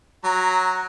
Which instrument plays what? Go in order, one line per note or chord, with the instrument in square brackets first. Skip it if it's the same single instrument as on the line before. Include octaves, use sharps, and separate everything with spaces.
[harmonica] F#3 A#5